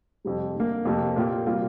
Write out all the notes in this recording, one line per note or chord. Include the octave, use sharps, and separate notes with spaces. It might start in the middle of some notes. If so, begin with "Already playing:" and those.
F2 C3 G3
G2 D3 A#3
F2 C3 A#3
A#2 A#3 G4
C3 G3 A#3 F4